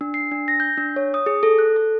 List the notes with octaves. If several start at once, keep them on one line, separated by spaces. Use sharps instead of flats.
D4
C7
D4
A#6
G6
D4
C#5
D#6
G#4
A4
F#6
A4